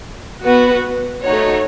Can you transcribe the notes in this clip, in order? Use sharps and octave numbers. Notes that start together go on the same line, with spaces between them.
B3 F#4 B4
A3 D#4 F#4 C#5